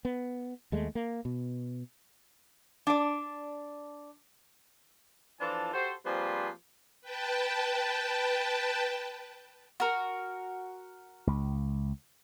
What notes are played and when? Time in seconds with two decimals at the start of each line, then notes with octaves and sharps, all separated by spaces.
0.05 B3
0.72 D#2 G#3 A3
0.95 A#3
1.25 B2
2.87 D4 D5
5.40 E3 F3 D4 F4 A4 A5
5.73 F#4 G4 A4 C5
6.05 F3 G3 A#3 C4 G#4 B4
7.01 B4 G5 A5
9.80 F#4 A#4
11.27 C#2